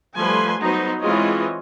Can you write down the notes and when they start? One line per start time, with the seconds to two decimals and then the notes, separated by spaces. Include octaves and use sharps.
0.18 F3 G3 A3 B4 G#5 C6
0.60 F#3 B3 D#4 F#4 C5
1.01 E3 G#3 C4 F4 C#5 D#5